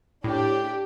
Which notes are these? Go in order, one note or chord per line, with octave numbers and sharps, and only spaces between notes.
A2 D4 G4